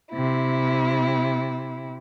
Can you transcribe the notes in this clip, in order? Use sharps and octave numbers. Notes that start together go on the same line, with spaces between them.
C3 E4